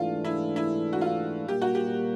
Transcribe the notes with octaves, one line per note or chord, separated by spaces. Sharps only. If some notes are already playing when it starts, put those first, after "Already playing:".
Already playing: G#2 E3 A3 D4 F4
E4
E4
F#4
F4
A#2 G3 A#3 G4
F#4
G4